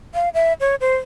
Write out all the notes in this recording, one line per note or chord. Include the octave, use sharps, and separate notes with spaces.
F5
E5
C#5
C5